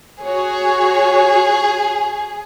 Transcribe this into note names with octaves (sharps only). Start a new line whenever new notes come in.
F#4 G#4 C#5